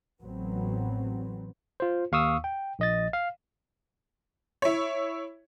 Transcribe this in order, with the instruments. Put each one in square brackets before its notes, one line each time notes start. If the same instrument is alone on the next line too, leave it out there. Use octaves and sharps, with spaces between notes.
[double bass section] A1 F#3 B3 C4
[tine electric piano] F4 C5
D#2 F5 C#6 D#6 E6
G5
A#1 D#5 A6
F5
[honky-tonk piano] E4 C#5